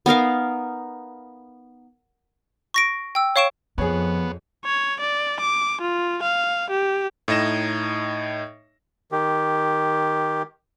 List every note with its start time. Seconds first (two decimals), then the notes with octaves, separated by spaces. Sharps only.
0.06 B3 D#4 A#4 F5
2.74 C#6 A#6 D7
3.15 G5 E6
3.36 C#5 F5 C#6 D7 E7
3.78 F2 F3 B3 G#4 C#5
4.65 C#5
5.00 D5
5.40 D6
5.81 F4
6.22 F5
6.70 G4
7.28 A2 D#4 D#5 A#6 E7
9.12 D#3 G4